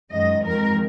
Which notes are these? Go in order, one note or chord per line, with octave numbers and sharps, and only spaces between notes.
F#2 D#3 G#3 D#5
F2 D#3 G#3 A#4